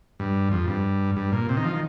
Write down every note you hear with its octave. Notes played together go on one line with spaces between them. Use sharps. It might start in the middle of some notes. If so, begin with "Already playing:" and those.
G2
F2
G2
G2
A#2
C3
D#3
F3
D#3